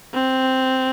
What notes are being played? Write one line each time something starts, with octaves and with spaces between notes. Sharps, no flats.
C4